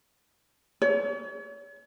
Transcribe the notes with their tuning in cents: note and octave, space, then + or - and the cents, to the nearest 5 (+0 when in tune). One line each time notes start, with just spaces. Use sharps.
C#5 +40